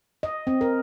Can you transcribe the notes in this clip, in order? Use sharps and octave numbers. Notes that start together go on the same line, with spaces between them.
D#5
C4
A#4